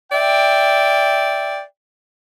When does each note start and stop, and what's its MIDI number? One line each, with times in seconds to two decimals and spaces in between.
0.12 1.62 74
0.12 1.62 76
0.12 1.62 79